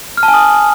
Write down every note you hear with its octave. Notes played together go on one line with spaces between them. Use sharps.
F6
A5
G#5
D#6